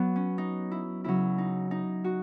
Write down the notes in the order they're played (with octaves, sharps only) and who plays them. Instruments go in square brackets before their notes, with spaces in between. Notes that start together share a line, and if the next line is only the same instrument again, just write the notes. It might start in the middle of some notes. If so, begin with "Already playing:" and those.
Already playing: [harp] F#3 B3
C#4
D#4
E4
C#3 F#3 E4
D#4
D#4
F#4